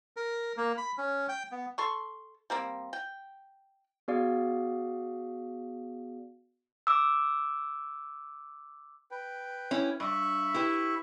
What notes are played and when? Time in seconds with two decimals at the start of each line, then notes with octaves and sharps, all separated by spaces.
0.17 A#4
0.57 A#3
0.77 B5
0.98 C#4
1.29 G5
1.52 B3
1.78 A4 C6 C#6
2.50 G3 A#3 C4
2.93 G5
4.08 B3 F#4 G#4 D5 F5
6.87 D6 E6
9.11 B4 G5
9.71 C#4 E4
10.00 G2 E5 B5 C#6
10.54 E4 G4 B4